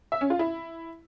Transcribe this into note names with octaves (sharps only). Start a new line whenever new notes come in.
E5
C#4
F4
E4